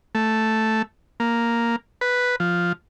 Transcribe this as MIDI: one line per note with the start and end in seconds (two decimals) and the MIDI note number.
0.15 0.82 57
1.20 1.76 58
2.01 2.36 71
2.40 2.73 53